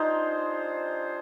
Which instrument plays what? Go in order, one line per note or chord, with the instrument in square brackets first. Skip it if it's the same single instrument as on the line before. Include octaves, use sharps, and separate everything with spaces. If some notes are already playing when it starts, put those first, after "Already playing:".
Already playing: [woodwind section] G3 D4 F4 G#4 C5 [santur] D#4